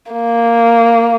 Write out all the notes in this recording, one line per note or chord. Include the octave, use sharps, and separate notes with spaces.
A#3